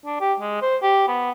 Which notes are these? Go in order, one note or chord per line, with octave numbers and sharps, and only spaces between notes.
D4
G4
G#3
C5
G4
B3